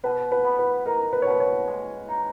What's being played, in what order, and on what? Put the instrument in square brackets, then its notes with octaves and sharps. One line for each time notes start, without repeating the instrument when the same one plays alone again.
[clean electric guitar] B2 [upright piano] B4
[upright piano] B4
[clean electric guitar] B3
[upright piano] B4
[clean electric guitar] D#4 [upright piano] A#4
[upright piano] B4
C#5
[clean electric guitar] B2 [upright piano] B4
[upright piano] C#5
[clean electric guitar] G#3
D#4